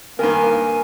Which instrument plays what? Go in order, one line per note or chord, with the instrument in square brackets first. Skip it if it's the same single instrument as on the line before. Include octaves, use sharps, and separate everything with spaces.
[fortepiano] G2 D#3 [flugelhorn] A#3 [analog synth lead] A#4 [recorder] G#5